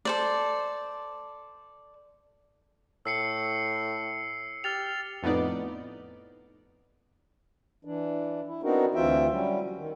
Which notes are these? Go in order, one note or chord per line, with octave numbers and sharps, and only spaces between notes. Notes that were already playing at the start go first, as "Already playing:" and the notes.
A4 C5 D5
A2 E6 C7 C#7
G4 F6 A6 F7
F2 A2 B3 D#4 D5
E3 D4
E4
B3 C4 D4 D#4 F#4 A#4
D2 E3 C4 F4 E5 G5
F#3 G3 C#4
D#3